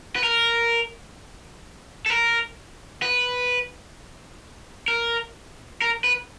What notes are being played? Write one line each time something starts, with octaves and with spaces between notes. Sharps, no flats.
B4
A#4
A4
A#4
B4
A#4
A#4
B4